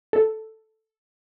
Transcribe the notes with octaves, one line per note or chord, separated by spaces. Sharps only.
A4